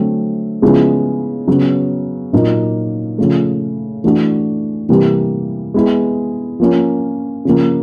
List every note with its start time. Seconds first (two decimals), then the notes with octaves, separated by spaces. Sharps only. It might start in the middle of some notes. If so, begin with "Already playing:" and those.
Already playing: D3 F#3 A3 C4
0.62 C#3 F3 G#3 B3 E4
1.48 C#3 F#3 B3
2.33 A#2 F#3 A#3 D#4
3.18 C#3 F3 A3
4.04 E3 A3 D4 F#4
4.89 C3 E3 G3 A#3
5.74 G#3 B3 E4 G#4
6.60 F3 A#3 C#4
7.45 C#3 F3 A#3